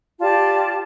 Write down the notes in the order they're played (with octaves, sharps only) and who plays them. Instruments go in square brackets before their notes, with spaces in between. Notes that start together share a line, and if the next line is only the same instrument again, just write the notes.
[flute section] F4 G4 D5 A5